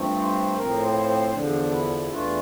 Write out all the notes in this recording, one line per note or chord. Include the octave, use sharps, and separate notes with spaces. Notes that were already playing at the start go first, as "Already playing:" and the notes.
Already playing: G2 F3 A3 C4
C5
A2 F3 C4 A#4
C5
C5
E2 D3 F3 D4
E4
E2 E3 A3 D4 F4